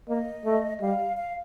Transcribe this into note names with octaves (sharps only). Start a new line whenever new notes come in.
A#3 D#5
A3
G3 F5
F5